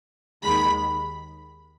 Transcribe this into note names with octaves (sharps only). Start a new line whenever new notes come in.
D#2 D#3 G#3 B5